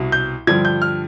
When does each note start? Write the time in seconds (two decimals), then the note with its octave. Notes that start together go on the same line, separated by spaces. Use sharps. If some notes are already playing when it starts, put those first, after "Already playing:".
Already playing: C2 B2
0.12 G6
0.47 G2 D3 F3 G#6
0.65 G6
0.82 F6